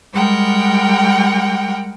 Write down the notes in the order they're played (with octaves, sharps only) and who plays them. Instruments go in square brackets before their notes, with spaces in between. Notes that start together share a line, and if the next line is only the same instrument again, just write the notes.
[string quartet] G3 G#3 A#4 F#5 G5